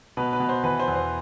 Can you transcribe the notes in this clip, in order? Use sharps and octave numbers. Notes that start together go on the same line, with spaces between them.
B2 B4
B4
B2
C5
E3 B4
C5
E2
C5